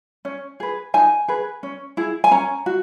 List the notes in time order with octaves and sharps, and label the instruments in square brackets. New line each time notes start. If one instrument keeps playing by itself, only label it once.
[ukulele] C#4
G#4 B4
D#4 G#5
G#4 B4
C#4
E4 G#4
G#5
C#4 A#5
F#4